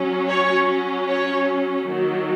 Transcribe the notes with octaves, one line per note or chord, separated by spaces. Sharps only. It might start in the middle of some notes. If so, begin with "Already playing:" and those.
Already playing: F#3 C#4
C#5
C#5
D#3 F#3 A#3